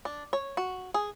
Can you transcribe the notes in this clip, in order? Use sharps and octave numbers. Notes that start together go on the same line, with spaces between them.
D4
C#5
F#4
G#4